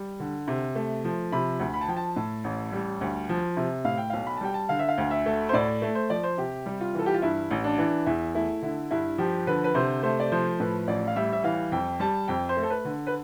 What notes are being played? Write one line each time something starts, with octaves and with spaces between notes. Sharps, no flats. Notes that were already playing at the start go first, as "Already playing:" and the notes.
Already playing: G3
D3
C3
A3
F3
C3 B5
D2
B5
A5
F3 G5
A5
A2
A1
G3
D2
F3
C3
A2 F5
G5
B1 F5
B5
A5
G3 G5
A5
D3 F5
E5
F5
D2
E5
A3
C5
A2 D5
A3
C5
F3 D5
C5
C3 G4
G3
F4
E3 A4
G4
F4
G2 E4
A1
D4
E3
E2 E4
A3 E4
D3 E4
G2 E4
F3 G4
D3 B4
B4
C3 C5
A3 C5
D5
F3 C5
A2 B4
A1 D5
F5
G3 E5
E5
E3 F5
F2 G5
G3 A5
F2 G5
C5
A3
A4
B4
D3
B4